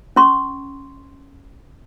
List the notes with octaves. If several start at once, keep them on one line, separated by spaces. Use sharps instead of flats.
C#4 C6 C#6